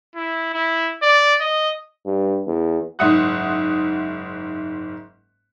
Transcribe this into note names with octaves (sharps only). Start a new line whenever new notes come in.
E4
E4
D5
D#5
G2
E2
F#1 G#2 E5 F#5 D#6 F#6